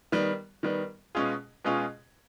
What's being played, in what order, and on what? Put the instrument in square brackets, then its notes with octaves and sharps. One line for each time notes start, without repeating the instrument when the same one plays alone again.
[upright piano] D#3 G3 B3
D#3 G3 B3
B2 G#3 C#4 F4 G#4
B2 G#3 C#4 F4 G#4